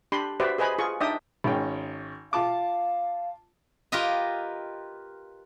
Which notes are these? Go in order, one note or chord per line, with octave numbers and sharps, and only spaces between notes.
D4 G4 B5 C6
F#4 G4 B4 C5 D5 E5
G#4 B4 C5 D#5 G#5 B5
F4 G#4 C#6
D4 D#4 D5 E5 G5 D#6
G#1 C#4 G5
F4 F5 A5 D6
F4 G4 A#4 B4 D#5